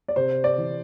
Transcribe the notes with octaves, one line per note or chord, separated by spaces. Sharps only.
D5
C3 C5
D5
E3